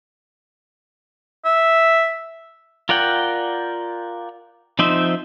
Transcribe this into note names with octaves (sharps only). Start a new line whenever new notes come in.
E5
F4 A#4 D5 F#5 G5
F3 C4 D#4 C5 E5